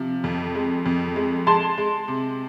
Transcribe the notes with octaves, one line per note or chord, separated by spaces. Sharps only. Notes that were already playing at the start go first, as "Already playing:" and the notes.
Already playing: C3 F3
F2
G#3
F2
G#3
G#3 A5 C6
G#3
C3